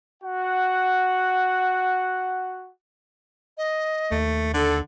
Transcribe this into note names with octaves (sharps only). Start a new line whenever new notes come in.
F#4 F#5
D#5
D#2 A3
D3 A4